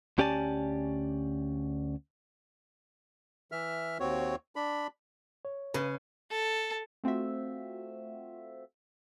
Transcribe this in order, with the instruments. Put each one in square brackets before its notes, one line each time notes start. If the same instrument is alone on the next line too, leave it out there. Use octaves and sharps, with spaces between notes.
[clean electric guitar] D2 C#4 G4 D5 G#5 A5
[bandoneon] E3 E5 F6
D#2 C4 F#4 C#5
D4 B5
[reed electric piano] C#5
[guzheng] C#3 [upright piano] B4
[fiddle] A4
[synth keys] A3 C4 F4 F#4 E5